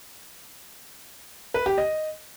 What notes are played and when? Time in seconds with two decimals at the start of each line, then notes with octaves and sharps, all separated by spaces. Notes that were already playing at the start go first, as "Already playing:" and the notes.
1.54 B4
1.66 G4
1.78 D#5